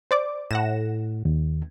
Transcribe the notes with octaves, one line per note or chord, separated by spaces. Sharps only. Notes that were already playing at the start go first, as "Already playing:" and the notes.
C5 D5 D6
A2 F#5 A#6 E7
D#2